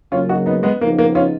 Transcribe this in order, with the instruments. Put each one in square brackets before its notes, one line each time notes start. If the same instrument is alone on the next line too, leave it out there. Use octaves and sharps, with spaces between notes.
[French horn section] C#3 F#3 A#3 [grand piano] C#4 F4
[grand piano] D#4 F#4
B3 D#4
G#3 B3
[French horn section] C#3 F3 B3 D#4 [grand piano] A#3
[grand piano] A#3
C#4 F4